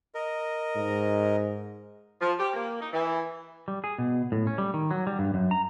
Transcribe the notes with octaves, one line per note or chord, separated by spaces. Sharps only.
A#4 D#5
G#2
F3
G4
A#3
D#4
E3
G3
G#4
B2
A2
C#4
G3
D#3
F#3
G3
G2
F#2
A#5